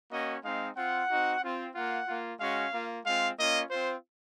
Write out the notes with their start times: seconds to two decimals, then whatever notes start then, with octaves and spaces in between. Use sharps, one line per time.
0.11 A#3 C#4 F#4 D#5
0.43 G#3 C4 D#4 F5
0.76 C4 F4 F#5
1.09 C4 D#4 F#4
1.42 C4 F4
1.74 A#3 F4 F#5
2.07 A#3 F4
2.39 G#3 C#4 F#4 F5
2.73 A#3 F4
3.05 G#3 C4 F4 F5
3.38 A#3 C#4 F4 D#5
3.70 C4 F4 C5